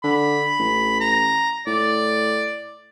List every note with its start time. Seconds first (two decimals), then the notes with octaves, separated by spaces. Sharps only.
0.04 D3 B5
0.59 A1
1.00 A#5
1.67 A2 D5